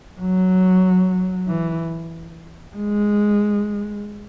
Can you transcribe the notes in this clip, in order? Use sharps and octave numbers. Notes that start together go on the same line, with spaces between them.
F#3
E3
G#3